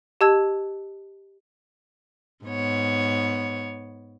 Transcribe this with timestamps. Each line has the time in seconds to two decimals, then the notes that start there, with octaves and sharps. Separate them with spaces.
0.21 G4 D#5 A5 E6 G#6
2.45 G#2 B3 C#5